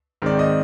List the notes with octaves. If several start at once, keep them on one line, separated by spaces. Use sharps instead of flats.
G#2 D#3 G#3 C4 D5
D#5